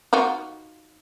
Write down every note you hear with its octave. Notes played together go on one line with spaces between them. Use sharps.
D#4 F4 F#4